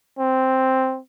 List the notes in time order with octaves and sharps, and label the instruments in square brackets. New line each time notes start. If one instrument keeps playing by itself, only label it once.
[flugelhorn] C4